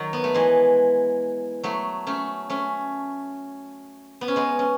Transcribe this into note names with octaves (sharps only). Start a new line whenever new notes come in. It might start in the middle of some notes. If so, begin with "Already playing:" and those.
Already playing: D#3 F#3
B3
A3
E3 G#3
F#3 A3
A3 C#4
A3 C#4
B3
C#4
G#3 B3
C#4